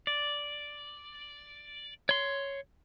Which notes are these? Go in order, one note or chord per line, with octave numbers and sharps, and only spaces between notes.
D5
C#5 C6